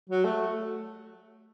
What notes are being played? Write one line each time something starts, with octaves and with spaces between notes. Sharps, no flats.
F#3
A3